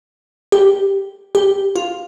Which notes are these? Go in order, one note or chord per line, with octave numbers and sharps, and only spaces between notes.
G4
G4
F4